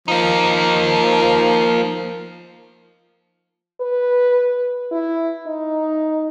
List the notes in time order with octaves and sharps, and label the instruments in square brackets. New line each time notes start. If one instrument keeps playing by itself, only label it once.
[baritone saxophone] F3 [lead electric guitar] A#3 D#4
[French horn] B4
E4
D#4